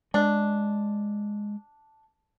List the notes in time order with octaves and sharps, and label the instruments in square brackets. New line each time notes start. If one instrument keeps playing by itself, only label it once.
[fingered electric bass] G#3 [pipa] D4